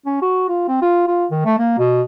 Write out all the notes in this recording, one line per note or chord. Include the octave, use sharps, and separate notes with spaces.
C#4
F#4
F4
C4
F4
F4
D#3
A3
A#3
B2